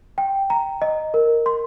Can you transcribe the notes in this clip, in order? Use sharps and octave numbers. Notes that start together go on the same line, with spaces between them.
G5
A#5
D#5
A#4
C6